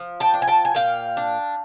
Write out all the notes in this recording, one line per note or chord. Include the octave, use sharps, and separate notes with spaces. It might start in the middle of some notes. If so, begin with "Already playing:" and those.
Already playing: F3
G5 A5
D4
G#5
G5 A5
G#5
A#2 F5 G5
D4